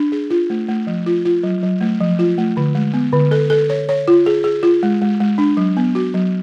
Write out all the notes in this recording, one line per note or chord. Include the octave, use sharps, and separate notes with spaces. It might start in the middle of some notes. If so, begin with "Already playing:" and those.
Already playing: D4
G#4
F4
A3
A3
F3
F4
F4
F#3
F#3
A3
F3
F4
A3
D3
G#3
B3
D3
A4
A4
C#5
C#5
F4
G#4
G#4
F4
G#3
G#3
G#3
D4
F#3
B3
F#4
F#3